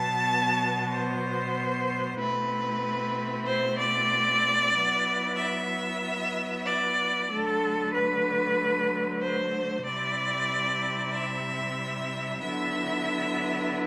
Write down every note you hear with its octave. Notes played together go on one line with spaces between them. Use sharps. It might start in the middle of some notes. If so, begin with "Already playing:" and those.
Already playing: B2 F#3 B3 A5
C5
B2 A3 C4 E4 B4
C5
D5
F#3 B3 E4
E5
D5
D3 F#3 A3 A4
B4
C5
C3 G3 C4 E4 D5
E5
D3 F#3 B3 E4 E5